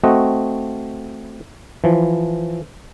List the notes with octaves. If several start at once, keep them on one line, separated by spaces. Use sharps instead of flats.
A3 C4 F#4 D#5
E3 F3